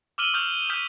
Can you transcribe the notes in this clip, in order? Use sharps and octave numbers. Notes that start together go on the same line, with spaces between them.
D6 E6 F6 D#7 F#7 G7
C#6 D#6 F6 G6 F7
D#6 F6 G6 B6 D#7